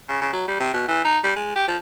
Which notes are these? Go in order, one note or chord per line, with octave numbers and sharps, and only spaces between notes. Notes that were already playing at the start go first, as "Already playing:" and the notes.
C#3
C#3
F#3
G3
C3
B2
E3
D#4
G3
G#3
G4
F3